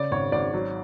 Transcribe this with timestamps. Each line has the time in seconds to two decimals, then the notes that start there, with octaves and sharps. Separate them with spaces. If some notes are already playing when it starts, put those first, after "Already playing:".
Already playing: C#3 D5
0.11 G#1 C#5
0.32 G#1 D5
0.54 F#3